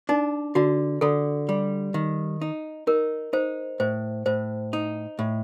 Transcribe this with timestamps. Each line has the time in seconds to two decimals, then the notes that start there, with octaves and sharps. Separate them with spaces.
0.09 D4 D#4
0.55 D3 F#4
1.01 D3 A4
1.49 G3
1.94 D#3
2.41 D#4
2.87 D#4 A#4
3.33 D#4 C5
3.80 A2 C5
4.26 A2 C5
4.73 D#4
5.19 A2